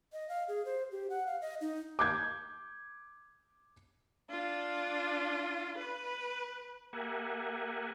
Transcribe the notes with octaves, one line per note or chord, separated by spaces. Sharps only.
D#5
F5
G#4
C5
G4
F#5
F5
D#5
D#4
D6 G6 G#6
D4 F4
B4
A#3 G4 A#4 E5 F#5 G#5